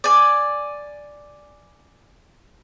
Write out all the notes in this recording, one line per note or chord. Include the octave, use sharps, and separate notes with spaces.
D5 G#5